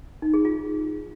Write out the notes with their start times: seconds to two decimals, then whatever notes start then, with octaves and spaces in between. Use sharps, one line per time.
0.22 D#4
0.34 G#4
0.45 F4